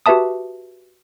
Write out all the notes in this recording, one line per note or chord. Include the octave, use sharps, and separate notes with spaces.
F#4 G4 B4 E5 A5 D#6